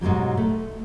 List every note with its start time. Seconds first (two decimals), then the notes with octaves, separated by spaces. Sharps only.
0.01 G#2 B2 D3 F#3 G3
0.37 A3